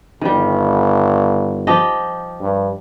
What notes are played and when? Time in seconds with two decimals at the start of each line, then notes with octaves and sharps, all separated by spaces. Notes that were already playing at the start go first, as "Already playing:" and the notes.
0.21 G1 D#3 G3
1.67 F3 G4 D#5
2.40 G2